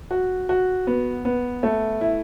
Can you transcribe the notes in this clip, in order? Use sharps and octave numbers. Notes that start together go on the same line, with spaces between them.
F#4
F#4
B3
B3
A3
E4